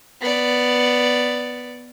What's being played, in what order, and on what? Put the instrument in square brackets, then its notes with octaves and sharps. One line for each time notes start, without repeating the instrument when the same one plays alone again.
[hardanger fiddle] B3 D5